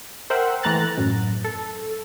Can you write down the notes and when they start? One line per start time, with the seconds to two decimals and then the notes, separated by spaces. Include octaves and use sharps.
0.30 A#4 C5 E5 F#5 G5
0.63 E3 A3 A#5 F#6 A6
0.98 F#2 A2
1.44 A4